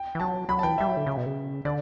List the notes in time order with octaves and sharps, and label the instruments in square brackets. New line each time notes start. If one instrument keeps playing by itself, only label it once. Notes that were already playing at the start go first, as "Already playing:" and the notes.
Already playing: [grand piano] G5
[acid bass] E3
[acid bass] F#3 [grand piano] A5
[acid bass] F#3 [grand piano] B5
[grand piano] A5
[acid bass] E3 [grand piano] G5
[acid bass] G3 [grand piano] E5
[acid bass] F#3
D3
C#3
B2
C#3
[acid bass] D3 [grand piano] D5